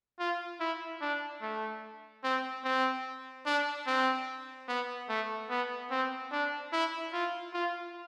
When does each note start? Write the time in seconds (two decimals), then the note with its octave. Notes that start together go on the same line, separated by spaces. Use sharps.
0.19 F4
0.60 E4
1.01 D4
1.42 A3
2.24 C4
2.64 C4
3.46 D4
3.87 C4
4.68 B3
5.09 A3
5.50 B3
5.91 C4
6.32 D4
6.73 E4
7.13 F4
7.54 F4